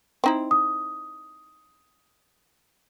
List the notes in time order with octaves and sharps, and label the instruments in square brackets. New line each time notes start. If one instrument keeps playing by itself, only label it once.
[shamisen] C4 D#4 E4
[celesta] D#6